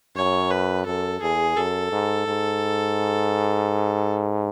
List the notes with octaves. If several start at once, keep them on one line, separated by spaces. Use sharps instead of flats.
F#2 C#5
B4
F#2 A4
E2 G#4
F#2 A4
G#2
G#2